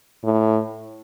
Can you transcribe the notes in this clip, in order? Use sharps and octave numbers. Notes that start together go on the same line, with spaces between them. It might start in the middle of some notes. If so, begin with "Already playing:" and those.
A2